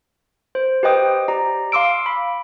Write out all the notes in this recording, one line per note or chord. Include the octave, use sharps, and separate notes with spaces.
C5
G4 B4 C5 D#5 G5 D#6
G4 D5 A#5
F5 C6 D6 E6 D7
B5